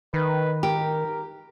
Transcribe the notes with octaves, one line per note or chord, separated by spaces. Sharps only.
D#3 B4
G4 A#4